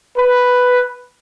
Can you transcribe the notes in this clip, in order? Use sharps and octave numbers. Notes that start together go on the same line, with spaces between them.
B4